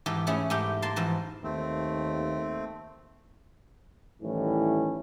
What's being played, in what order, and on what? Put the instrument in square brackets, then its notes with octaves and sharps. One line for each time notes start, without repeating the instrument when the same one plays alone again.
[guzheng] G#2 E3 G4 A4
A3 C#4 E4 G#4
G#2 A3 G4 G5
A#3 A5 C6
G#2 E3 F3
[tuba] D#2 [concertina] A3 C4
[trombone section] A2 D#3 E3 G3 C#4